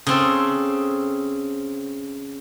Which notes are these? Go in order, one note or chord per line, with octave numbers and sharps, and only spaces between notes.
C#3 C4 A4